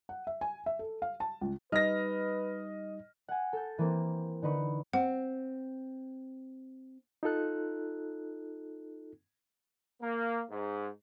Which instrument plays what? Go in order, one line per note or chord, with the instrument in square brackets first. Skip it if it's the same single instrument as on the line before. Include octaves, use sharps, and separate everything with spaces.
[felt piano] F#5
E5
G#5
E5
A4
F5
A5
C#2
[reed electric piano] G3 D#4 [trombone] B4 [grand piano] D#5 [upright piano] F6 A#6
[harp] F#5 G#5
A4 G6
E3 A#3 C4
D3 D#4 B4 C#6
[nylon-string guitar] C4 [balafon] F#5
[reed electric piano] D#4 F4 A4 F#6
[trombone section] A#3
G#2